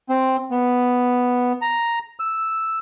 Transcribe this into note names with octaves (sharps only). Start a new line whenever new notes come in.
C4
B3
A#5
E6